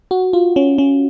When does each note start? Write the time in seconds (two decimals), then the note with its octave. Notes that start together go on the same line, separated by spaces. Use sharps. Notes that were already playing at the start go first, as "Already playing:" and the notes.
0.11 F#4
0.33 F4
0.56 C#4
0.78 C#4